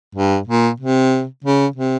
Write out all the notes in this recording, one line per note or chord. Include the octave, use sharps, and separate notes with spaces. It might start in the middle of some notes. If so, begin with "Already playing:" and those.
G2
A#2
C3
C#3
C3